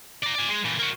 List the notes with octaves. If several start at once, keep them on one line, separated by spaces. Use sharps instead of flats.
D5 A#5
D5 G#5
G#3
A#2 E3
A#3 F#4